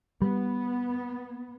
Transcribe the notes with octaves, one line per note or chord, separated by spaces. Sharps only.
G3 B3